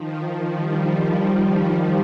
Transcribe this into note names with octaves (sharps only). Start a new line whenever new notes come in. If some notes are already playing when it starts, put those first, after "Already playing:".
Already playing: D#3 F3
D#3 F3
F3 G3